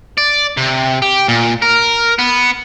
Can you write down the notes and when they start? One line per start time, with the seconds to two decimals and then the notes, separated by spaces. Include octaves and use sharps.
0.18 D5
0.57 C3
1.02 G4
1.28 A#2
1.62 A#4
2.19 B3